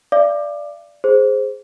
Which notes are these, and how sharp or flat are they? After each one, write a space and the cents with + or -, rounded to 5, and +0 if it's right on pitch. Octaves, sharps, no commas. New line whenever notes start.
D5 +0 F5 -40 D6 +20
G#4 +0 C5 +0